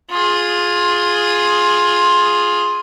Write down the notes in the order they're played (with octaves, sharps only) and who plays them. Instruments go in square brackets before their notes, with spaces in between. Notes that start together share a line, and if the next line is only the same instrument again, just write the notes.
[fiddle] F4 G#4